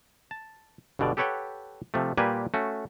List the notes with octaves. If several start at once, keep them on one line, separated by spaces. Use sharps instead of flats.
A5
G1 G2 B2 D3 D5
G4 A4 B4 C#5 F#5 G5
C3 F3 A3
A#2 G3 A#3 G4 B4 G#5
A3 C#4 F#4